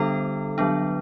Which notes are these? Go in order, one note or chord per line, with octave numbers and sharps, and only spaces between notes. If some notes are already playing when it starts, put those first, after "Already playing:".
Already playing: D3 G3 B3 D4 A4
D3 F#3 B3 D4